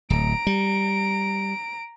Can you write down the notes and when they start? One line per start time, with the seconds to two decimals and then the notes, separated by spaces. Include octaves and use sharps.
0.10 D1 A#5 D7
0.47 G3